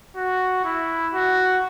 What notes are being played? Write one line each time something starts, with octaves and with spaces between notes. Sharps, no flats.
F#4
E4
F#4